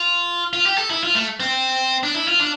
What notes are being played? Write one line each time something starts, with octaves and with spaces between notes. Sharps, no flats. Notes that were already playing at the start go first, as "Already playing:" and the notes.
Already playing: F4
F4
G4
A4
E4
F4
A3
C4
D4
E4
F4
D4